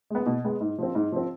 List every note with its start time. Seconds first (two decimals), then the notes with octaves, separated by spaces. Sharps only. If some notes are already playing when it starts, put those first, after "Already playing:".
0.10 G#3 B3
0.26 B2
0.44 G#3 B3
0.61 G#2
0.78 F3 C4
0.95 G#2
1.12 F3 C4